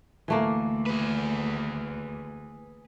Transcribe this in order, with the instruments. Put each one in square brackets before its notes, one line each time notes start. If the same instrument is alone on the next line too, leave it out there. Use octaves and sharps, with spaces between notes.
[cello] D2 [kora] E3 A3 A#3
[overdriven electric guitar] G#4 B4